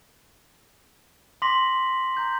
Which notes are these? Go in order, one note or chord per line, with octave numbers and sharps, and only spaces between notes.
C6 D6 A#6 B6 F#7
A#5 G6